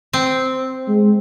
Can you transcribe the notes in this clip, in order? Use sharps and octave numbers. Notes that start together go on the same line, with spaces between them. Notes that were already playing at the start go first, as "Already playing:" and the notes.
C4
G#3